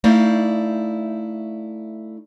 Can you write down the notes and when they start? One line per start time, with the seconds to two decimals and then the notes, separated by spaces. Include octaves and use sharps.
0.04 A3 D#4 E4 D5 F5